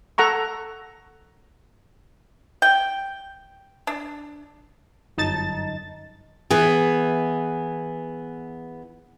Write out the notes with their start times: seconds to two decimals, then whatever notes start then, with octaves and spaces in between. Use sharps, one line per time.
0.18 A4 F#5 A#5 C#6
2.62 G5
3.87 D4
5.17 G1 F#2 D#4 A5 A6
6.51 E3 B3 G#4